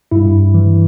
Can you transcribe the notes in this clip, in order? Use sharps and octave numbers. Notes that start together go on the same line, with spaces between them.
G2 E4
E3